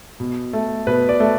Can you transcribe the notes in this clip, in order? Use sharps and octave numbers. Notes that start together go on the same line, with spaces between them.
B2
A3
B2 B4
D5
A3